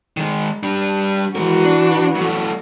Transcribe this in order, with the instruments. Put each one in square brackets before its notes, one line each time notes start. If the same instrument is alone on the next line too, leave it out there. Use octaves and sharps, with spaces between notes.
[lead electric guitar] D#3 G#3
G3 D4
[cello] E3 F#4 [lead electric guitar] G#3 A#4
[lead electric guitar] D4
F#3 A3